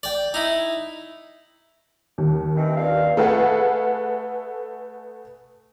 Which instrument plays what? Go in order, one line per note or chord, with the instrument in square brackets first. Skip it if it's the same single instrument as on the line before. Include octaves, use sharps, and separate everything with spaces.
[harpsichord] D5 G5
D#4 E4
[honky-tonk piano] D#2
[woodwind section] D#3 E3 C4
G2 A#2 F5
[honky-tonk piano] A3 G#4 A4 B4 F5 F#5